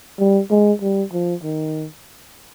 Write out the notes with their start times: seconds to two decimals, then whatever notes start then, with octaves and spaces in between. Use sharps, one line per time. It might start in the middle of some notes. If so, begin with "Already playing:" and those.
0.19 G3
0.50 G#3
0.81 G3
1.12 F3
1.43 D#3